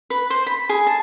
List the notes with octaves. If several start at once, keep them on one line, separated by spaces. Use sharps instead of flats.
B4
C5
B5
G#4
A5